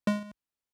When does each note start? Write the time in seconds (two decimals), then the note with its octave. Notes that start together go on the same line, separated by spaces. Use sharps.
0.07 G#3